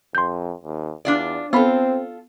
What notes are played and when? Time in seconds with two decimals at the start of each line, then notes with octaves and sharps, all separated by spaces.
0.15 F2 C6 G6
0.64 D#2
1.05 E2 D4 F4 D5
1.53 B3 C4 F4 A4 B5